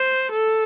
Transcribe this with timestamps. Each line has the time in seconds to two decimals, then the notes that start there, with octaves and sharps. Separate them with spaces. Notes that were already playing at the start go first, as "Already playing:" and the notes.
Already playing: C5
0.32 A4